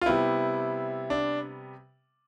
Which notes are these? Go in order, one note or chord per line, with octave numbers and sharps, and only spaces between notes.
F4
C3 G3 B3 E4
D4